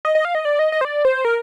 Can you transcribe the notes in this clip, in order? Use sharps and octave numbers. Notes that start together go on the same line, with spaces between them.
D#5
D#5
F5
D#5
D5
D#5
D#5
C5
D5
C5
A#4